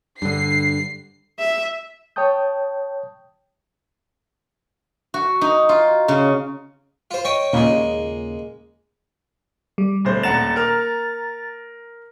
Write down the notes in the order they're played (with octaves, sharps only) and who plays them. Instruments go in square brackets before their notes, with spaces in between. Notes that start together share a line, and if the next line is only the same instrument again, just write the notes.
[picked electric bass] G2 D3 [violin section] C7
[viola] E5
[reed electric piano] C#5 G5 A5 D#6 G6
[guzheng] F#4
D#4
F4
C#3
[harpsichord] F4 C5
C#5 D#5 G5
[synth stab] D#2 A#2 C#3 [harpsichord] G#3 A#3
[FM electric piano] G3
[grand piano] D1 C5
[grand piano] D#1 F#5 E7 [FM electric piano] A#5 A6
[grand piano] A#4 F6